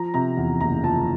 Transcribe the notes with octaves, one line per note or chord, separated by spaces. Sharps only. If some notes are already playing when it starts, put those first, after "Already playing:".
Already playing: F3 A#5
C3 A#5
E2
F#1 A#5
F3 A5